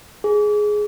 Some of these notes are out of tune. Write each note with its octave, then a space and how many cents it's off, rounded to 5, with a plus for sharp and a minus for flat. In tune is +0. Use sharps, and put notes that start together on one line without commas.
G#4 +10